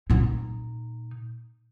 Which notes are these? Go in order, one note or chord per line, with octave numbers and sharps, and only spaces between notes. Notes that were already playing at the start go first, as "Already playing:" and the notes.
A#2 D#4